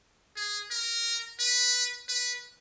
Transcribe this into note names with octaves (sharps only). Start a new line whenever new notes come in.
G#4
A#4
B4
B4